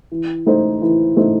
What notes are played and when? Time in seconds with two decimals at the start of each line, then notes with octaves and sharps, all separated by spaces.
0.12 E3
0.46 A3 D#4 A4 C5
0.82 E3
1.17 A3 D#4 A4 C5